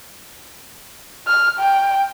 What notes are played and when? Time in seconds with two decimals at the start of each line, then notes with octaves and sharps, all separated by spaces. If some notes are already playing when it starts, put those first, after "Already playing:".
1.27 F6
1.59 G5